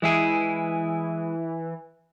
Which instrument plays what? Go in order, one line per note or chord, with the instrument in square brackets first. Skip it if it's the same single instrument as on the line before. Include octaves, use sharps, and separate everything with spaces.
[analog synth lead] E3 [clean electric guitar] G#3 E4 G#4